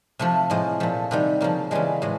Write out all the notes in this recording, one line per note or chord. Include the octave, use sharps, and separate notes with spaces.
C3 F3 A3
A2 F3 G#3
A#2 F3 A3
C3 D#3 G3
C#3 F3 A#3
C#3 E3 G3 G#3
A2 E3 G#3